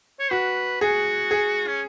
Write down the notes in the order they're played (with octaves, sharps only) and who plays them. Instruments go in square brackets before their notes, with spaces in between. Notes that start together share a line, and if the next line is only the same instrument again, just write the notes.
[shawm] C#5
[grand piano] F#4 [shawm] B4
[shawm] F#4 [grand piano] G#4
[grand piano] G#4
[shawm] C#4